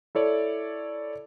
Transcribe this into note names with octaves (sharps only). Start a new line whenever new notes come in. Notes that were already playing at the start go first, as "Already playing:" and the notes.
E4 A4 C#5 D5